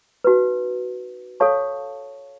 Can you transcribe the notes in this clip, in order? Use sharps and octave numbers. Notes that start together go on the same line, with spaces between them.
D#4 F#4 B4
A4 C#5 F5 A5 C#6